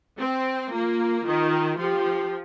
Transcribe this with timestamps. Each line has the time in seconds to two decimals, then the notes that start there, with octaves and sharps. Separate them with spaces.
0.18 C4
0.71 A#3 F4
1.25 D#3 F4
1.78 F3 G4